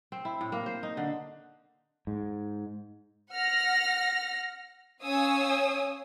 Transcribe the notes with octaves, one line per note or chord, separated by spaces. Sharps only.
C4
E4
A2
A#3
C5
D#4
D3
G#2
F#5 F6 A#6
C#4 C#5 F5 G#5 D#6 E6